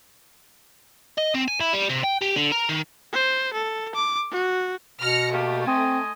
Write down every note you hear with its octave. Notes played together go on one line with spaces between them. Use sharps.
D#5
C4
G#5
E4
G3
C3
G5
G4
D3
A#4
D#3
C5
A4
D6
F#4
B2 F6 A#6 C#7
A3 A#3 G4
C4 D#5 G#5 C6